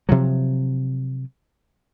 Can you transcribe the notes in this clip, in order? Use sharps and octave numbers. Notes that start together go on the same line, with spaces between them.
C3 F3 F#3